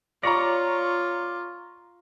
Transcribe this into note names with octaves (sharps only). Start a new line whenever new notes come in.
F4 C#5 D5 A#5 C#6 A#6